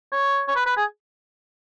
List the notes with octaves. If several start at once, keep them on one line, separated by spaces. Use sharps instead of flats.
C#5
C#5
B4
B4
G#4